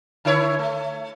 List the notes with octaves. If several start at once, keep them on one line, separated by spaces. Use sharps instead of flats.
D3 E4 C#5
A3